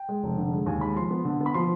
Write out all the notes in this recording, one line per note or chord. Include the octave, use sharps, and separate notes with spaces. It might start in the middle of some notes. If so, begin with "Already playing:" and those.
Already playing: G5
G#3
F1
D3
G#3
D#2 G#5
G#3 B5
F3 C6
B3
D3
B3
B5
F3 C6